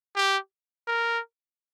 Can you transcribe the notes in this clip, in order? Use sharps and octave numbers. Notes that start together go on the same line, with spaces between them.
G4
A#4